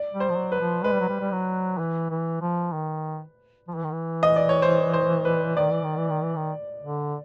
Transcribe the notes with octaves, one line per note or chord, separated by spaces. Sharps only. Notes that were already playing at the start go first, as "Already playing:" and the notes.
Already playing: D5
G3
C5
F3
F#3
B4
F3
G#3 B4
G3
F#3
G3
G3
F#3
E3
E3
F3
D#3
F3
E3
D#3
E3
D#5
D5
C#5
C5
C5
B4
D#3 D5
E3
D#3
E3
D#3
E3
D#3
D3